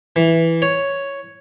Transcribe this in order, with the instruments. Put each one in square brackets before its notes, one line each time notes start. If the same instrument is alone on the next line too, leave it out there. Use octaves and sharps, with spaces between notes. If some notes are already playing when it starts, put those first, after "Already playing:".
[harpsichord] E3
C#5